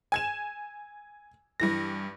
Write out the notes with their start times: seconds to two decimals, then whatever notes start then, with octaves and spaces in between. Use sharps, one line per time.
0.12 G#5 G#6 E7
1.60 G2 E3 A#6